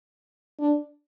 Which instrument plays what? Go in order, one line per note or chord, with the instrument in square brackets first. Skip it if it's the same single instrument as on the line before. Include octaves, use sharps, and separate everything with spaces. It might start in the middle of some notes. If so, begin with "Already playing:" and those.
[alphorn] D4